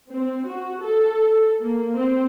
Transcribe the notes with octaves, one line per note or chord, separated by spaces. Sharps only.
C4
F#4
A4
A#3
C4